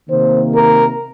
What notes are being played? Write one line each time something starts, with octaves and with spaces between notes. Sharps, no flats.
C3 D#3 A#3 C5
A#4